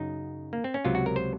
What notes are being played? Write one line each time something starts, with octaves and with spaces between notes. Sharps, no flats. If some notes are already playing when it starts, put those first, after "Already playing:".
Already playing: F#2 C#3 F#3 D#4
A#3
C4
C#4
C#2 C3 F#3 F4
F#4
A#4
C5